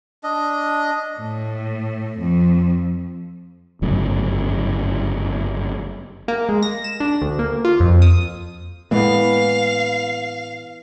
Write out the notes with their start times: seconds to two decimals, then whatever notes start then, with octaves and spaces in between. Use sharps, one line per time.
0.23 D4 D#5
1.19 A2
2.18 F2
3.82 G1 F#2 A2 C#3
6.28 A#3
6.49 G#3
6.63 A#6
6.84 E7
7.00 D4
7.22 D2
7.39 A#3
7.65 F4
7.80 F2
8.02 D#6
8.91 A2 E3 G#3 A#3 B3 F5